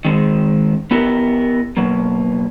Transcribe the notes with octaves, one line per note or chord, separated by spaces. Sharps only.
D#3 G#3 C4
B3 E4 G4 A#4
B2 F#3 A#3